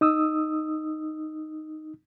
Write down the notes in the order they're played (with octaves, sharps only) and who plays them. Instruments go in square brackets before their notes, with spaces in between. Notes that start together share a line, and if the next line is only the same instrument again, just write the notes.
[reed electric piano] D#4 D#6 E6